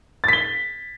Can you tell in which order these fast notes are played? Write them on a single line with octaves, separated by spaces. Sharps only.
A6 B6 G7